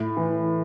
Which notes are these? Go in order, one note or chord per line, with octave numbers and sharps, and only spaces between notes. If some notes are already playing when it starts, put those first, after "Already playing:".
Already playing: A2
E3